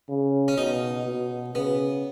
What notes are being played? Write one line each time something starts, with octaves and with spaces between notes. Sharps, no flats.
C#3
C#4
B2 D#4
B2
C#3 B3